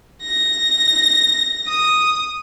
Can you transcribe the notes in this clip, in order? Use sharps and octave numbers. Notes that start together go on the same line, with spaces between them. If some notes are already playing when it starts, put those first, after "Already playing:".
A#6
D#6